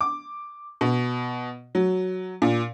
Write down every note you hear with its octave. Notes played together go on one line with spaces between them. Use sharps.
D6
B2
F#3
A#2